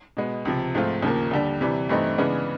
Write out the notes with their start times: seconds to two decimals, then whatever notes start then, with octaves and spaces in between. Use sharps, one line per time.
0.17 B2 G#3 B3
0.45 C#2 C3 F3
0.75 G#2 F3 A3 C4 F4
1.03 D#2 C#3 F3 A#3
1.31 D#2 D3 G3
1.61 C3 E3 G3
1.89 G2 E3 A3 C4 D#4
2.18 C#3 E3 G#3 B3 D4